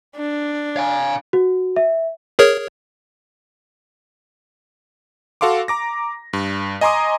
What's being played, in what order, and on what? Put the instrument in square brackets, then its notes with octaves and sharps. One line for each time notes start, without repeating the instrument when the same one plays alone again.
[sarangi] D4
[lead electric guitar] F5 G#5
[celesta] F#4
E5
[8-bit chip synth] G#4 A#4 C#5
[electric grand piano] F#4 A4 F5 C6 D6
A#5 D6 A#6
G2
D#5 G#5 A#5 C6 D6 D#6